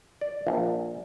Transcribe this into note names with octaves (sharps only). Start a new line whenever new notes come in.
D5
A#1